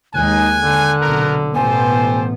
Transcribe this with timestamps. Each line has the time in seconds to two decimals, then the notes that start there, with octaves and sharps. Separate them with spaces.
0.15 D#2 G#3 D#4 G#5 F#6
0.56 D3
1.02 B1 C3 B3 A#4
1.55 A1 B2 B3 G4 A4 C5 G#5